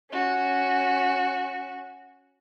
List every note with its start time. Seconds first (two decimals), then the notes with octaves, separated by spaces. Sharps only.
0.11 C#4 F#4